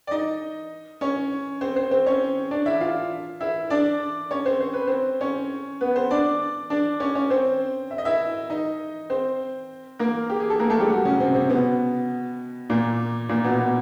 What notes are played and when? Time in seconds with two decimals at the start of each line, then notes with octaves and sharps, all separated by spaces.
0.07 D5
0.11 D#4 D#5
1.01 C#4 C#5
1.61 C4 C5
1.76 C4 C5
1.91 C4 C5
2.06 C#4 C#5
2.51 D4 D5
2.66 E4 E5
2.81 F4 F5
3.41 E4 E5
3.70 D4 D5
4.31 C#4 C#5
4.46 C4 C5
4.60 C5
4.73 B4
4.87 C4 C5
5.21 C#4 C#5
5.81 B3 B4
5.95 C4 C5
6.11 D4 D5
6.70 D4 D5
7.00 C#4 C#5
7.15 C#4 C#5
7.30 C4 C5
7.91 E5
7.98 D#5
8.05 E4 E5
8.50 D#4 D#5
9.10 C4 C5
9.99 A#3 A#4
10.30 G4
10.40 G#4
10.50 A4
10.60 A#3 A#4
10.70 A3 A4
10.80 G3 G4
10.90 F#3 F#4
11.05 C#3 C#4
11.20 C3 C4
11.35 C3 C4
11.50 B2 B3
12.70 A#2 A#3
13.29 A#2 A#3
13.44 B2 B3
13.59 B2 B3